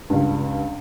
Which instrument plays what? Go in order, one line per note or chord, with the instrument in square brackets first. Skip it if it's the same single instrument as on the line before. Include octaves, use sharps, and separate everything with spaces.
[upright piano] C#2 G2